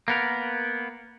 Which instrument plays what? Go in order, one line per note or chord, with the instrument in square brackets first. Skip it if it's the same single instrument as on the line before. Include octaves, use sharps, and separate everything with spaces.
[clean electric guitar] A#3 B3 A#4